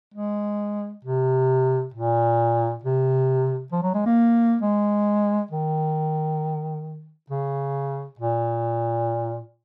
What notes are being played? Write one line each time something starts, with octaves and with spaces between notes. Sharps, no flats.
G#3
C3
A#2
C3
F3
F#3
G#3
A#3
G#3
D#3
C#3
A#2